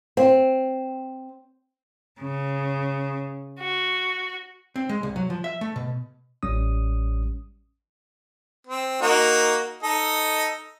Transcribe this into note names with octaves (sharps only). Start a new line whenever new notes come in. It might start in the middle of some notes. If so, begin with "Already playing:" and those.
C4
C#3
F#4
C4
G#3
C2
F#3
F3
E5
A3
B2
A1 G3 C#4 D#6
C4
A#3 D#4 F#4
D#4 A4 D#5